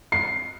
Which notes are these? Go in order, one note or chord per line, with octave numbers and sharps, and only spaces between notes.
C7